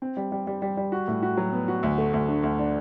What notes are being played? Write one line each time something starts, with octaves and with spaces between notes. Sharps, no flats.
C4
G3
G3
G3
G3
G3
F#4
A2
F#4
F#3
B3
F#4
D2
A3
D2
D3
D2
D4